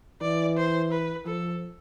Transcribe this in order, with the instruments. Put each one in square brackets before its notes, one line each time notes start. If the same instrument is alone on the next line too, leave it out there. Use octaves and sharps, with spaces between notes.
[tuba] E3 [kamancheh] D5
[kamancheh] C5
B4
[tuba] F3 [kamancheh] A4